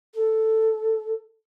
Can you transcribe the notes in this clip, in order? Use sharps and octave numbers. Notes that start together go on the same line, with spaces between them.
A4